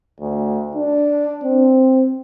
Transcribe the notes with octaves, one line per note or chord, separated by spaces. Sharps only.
D2
D4
C4